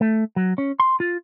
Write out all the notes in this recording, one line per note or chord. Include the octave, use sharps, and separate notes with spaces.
A3
F#3
C#4
C6
F4